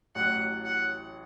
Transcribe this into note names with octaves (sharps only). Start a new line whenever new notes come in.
A1 A2 F#3 F#5
F#5